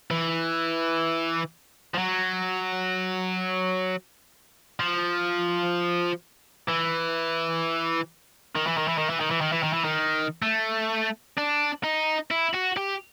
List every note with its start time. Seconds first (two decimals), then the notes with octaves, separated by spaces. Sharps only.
0.11 E3
1.94 F3
1.98 F#3
4.80 F3
6.68 E3
8.55 D#3
8.67 E3
8.77 D#3
8.88 E3
8.98 D#3
9.10 E3
9.20 D#3
9.31 E3
9.41 D#3
9.53 E3
9.63 D#3
9.73 E3
9.85 D#3
10.42 A3
11.37 D4
11.84 D#4
12.31 E4
12.54 F#4
12.77 G4